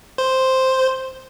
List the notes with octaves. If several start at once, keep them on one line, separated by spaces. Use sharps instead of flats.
C5